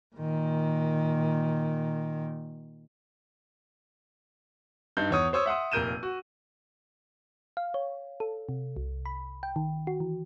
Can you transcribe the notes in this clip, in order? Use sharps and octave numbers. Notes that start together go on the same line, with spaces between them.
A#2 D#3
G2 D#4 G6
E2 C#5 D#6
C5 C#5 D#6 E6
E5 F#5 C6 D#6
F1 A#2 A#4 G6 D#7 E7
F#4
F5
C#5
A4
C3
C2
B5
G5
D#3
F#4
E3